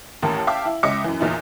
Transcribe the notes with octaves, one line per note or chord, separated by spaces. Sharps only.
A1 D#2 A2 A#4 A5
E5 F5 G5 A5 D6
E4
C#2 D#5 E5 D6 C#7
F#2 E3
E2 A#2 D#4 E4